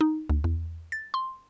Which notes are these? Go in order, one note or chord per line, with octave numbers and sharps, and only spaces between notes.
D#4
D2
E2
A6
C6